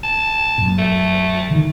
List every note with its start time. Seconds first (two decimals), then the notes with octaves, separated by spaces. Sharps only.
0.03 A5
0.58 F#2 A#2
0.78 A3
1.50 D3 D#3